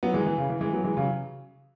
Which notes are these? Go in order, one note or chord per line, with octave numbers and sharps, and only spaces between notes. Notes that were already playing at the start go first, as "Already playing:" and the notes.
F#3 B3
E3 G#3
E3
C#3
E3
E3 G#3
F#3 B3
E3 G#3
C#3 F#3